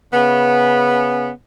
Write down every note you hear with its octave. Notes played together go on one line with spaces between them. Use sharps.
C#3 B3